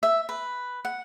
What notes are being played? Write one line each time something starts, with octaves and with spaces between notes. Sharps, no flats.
E5
B4
F#5